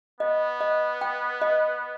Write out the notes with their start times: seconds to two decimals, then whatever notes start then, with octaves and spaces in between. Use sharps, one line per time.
0.20 B3 D#5
0.61 D#5
1.01 G5
1.42 D#5